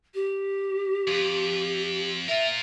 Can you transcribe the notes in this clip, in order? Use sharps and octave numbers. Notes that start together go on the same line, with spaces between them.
G4
F2
F4 A#4 E5